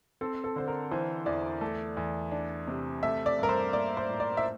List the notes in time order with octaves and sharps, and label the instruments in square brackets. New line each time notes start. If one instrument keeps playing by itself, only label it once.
[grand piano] C4 [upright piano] A4
[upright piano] A4
[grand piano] D3 [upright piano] C5
[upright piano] A#4
[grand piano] E3 [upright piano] C5
[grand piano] E2 [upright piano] D5
[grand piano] A3
E2
D4
C3
[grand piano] A3 [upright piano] E5
[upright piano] D5
[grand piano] G2 [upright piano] A#4
[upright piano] C5
[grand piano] A#3 [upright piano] D5
[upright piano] C5
[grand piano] A2
[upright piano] D5
E5